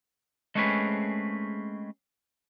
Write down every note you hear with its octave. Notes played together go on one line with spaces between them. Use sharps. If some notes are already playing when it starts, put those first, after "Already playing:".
G#3 A3 C4 C#4 G#4 B4